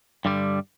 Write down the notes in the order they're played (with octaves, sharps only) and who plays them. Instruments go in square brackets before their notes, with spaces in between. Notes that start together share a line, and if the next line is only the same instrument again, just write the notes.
[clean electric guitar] G2 D3 G3